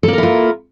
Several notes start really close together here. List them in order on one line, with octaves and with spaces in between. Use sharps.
A4 A#3 A#4 E4 F4